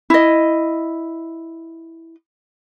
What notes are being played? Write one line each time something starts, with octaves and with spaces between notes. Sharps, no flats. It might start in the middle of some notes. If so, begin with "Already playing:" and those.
E4 D#5